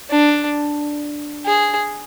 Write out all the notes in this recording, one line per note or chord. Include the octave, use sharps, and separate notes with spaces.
D4
G#4